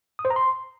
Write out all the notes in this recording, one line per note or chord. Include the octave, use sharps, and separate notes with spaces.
D#6
C5
A#5
C6